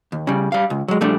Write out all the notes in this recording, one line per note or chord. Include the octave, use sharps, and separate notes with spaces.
D#2
C#3 G3
G3 F5
C#2
F#3 G#3
A#2 F3 G3 A3 D4